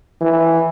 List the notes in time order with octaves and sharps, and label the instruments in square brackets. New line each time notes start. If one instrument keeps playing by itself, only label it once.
[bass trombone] E3